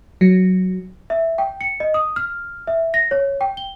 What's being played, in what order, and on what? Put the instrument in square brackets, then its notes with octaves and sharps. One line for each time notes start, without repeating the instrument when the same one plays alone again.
[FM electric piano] F#3
[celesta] E5
G5
C#7
D#5
D#6
F6
E5
A#6
C#5
G5
G7